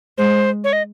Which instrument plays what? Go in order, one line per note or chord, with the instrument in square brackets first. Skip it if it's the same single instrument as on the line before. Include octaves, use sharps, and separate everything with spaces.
[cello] G#3 [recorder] C5
[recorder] C#5
D#5